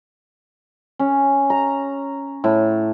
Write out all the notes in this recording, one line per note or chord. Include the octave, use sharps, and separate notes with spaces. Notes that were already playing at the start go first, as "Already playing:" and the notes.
C#4
A#5
A2